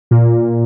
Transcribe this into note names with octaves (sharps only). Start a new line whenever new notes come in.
A#2